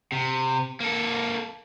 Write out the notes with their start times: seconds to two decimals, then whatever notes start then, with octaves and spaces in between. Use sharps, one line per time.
0.12 C3
0.80 A#3 A4